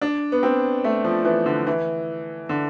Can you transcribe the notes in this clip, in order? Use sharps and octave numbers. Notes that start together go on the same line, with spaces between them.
D4
B3
C4
A3
F3
E3
D3
E3
D3